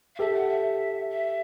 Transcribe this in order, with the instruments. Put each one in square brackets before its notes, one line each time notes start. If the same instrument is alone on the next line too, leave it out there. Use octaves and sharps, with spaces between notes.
[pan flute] F5
[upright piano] G4 A4 [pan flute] E5
[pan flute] F#5
E5
E5